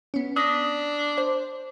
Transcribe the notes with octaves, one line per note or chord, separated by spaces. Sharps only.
B3 C#4
D4 D#6 A#6 B6
C5